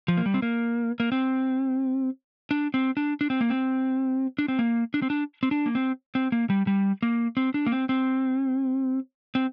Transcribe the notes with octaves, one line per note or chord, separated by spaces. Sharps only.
F3
A#3
G3
C4
A#3
A#3
C4
D4
C4
D4
D4
C4
A#3
C4
D4
C4
A#3
D4
C4
D4
C4
D4
A#3
C4
C4
A#3
G3
G3
A#3
C4
D4
A#3
C4
C4
C4